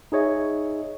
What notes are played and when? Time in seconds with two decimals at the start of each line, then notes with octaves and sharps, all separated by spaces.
0.12 D#4 G#4 C#5 D#5 E5